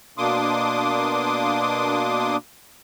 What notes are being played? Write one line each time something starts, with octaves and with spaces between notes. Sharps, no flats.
B2 A#3 D4 C6 D6 D#6